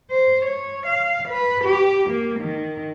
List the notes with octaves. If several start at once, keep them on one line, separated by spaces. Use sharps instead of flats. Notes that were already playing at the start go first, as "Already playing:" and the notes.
C5
C#5
F5
B4
G4
A#3
D#3